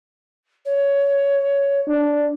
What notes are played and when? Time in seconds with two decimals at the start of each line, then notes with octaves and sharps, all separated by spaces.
0.65 C#5
1.88 D4